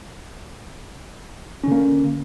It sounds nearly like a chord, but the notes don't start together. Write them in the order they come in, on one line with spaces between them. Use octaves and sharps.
C#4 D3 A#3